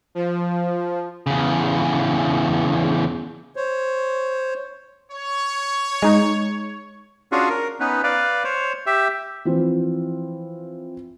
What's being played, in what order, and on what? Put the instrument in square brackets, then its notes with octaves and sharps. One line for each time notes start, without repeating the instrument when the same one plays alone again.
[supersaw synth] F3
[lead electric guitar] E2 C#3
[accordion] C5 C#5
[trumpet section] C#5
[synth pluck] G#3 D#4
[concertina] C#4 D4 F4 F#4 G#4
A#4
B3 C#4 D#4 B4
B4 D5 F5
C5 C#5
G4 E5
[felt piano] E3 F3 C4 F4